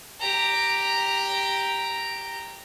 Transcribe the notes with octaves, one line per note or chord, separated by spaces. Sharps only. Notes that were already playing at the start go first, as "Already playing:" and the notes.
G4 A#5